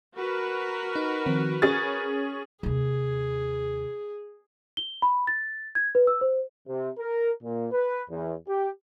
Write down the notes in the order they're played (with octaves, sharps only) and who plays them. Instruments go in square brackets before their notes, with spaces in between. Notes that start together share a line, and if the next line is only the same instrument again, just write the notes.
[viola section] F#4 A#4 B4
[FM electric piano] D#4
D#3 F3 C4
[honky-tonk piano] C#4 G#4 A6 [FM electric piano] C#6
[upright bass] D#2 C3 [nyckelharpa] G#4
[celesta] G7
B5
A6
G#6
B4
E6
C5
[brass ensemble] C3
A#4
A#2
B4
E2
G4